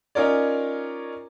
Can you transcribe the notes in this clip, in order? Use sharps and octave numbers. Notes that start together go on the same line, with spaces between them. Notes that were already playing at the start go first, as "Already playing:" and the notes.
C#4 D#4 F4 A#4 C#5 D5